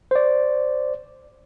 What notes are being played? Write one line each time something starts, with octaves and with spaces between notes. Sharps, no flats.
C5 D5